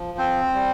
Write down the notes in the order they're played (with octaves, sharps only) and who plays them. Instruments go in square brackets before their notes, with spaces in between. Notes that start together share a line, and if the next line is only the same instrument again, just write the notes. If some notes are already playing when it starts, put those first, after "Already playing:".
Already playing: [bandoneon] F3
C4 C5
G3